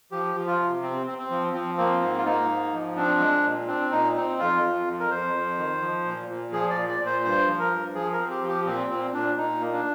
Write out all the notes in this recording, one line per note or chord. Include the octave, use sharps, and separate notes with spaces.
F3 G4
F3
F4
C3
C4
C4
C4
F3
F3 C4
A#3 C4
G#2 C4
F4
A#3 D#4
G#2
F3
C4 D4
G#3
A#2
C4 D4
A#2 D#4
C4 D#4
F2 F4
F2
F2
A#4
F2 C5
F2
D#3
F3
A#2
A#2
F3 G#4
D5
A#2
D5
A#2
C5
G2 C5
F3
A#4
G2
F3 G#4
A#4
C4
G4
F3
G4
A#2 C4
A#2 C4
A#2 D4
A#2 D#4
A#3
D4